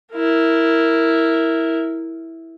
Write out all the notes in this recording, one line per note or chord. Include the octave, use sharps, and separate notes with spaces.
E4 A#4